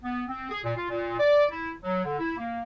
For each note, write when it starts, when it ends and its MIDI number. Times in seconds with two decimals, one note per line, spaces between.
0.04 0.23 59
0.28 0.49 60
0.50 0.60 68
0.64 0.73 46
0.76 0.87 65
0.90 1.16 46
1.20 1.45 74
1.50 1.71 64
1.84 2.04 54
2.04 2.16 50
2.19 2.37 64
2.37 2.62 58